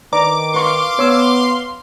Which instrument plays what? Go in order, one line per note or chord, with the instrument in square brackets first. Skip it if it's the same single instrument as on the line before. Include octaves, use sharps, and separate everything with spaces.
[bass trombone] D#3 [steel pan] B4 D5 A#5 [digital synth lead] D6
[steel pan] B4 C#6 [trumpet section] F5 C6
[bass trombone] B3 [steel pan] C#5 E6